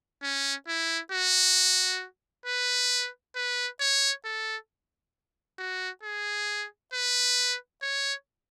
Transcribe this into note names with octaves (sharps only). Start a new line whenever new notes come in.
C#4
E4
F#4
B4
B4
C#5
A4
F#4
G#4
B4
C#5